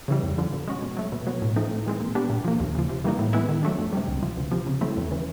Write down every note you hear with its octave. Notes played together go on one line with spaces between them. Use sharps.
C#3 E3 G3
F2
D3 F3
B2
G#3 C#4 F#4
B2
F#3 A3
B2
F#3 B3
A2
F3 A3 C4 D#4
A2
E3 G#3 C4
A#2
G3 B3 D4
A#2
F3 A#3
D#2
C#3 F3
C3
E3 G3 A#3 D#4
A2
E3 G#3 B3 E4
D#3
F#3 A3 D4
F2
C3 D#3 G3
C#2
C3 F3
D2
C3 F3
C#3
F#3 A3 C4 E4
E2
C#3 E3